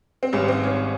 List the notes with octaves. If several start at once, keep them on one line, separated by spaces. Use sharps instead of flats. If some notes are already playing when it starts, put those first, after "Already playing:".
C4
G#1 G#2 G3 C#4
C4
C#4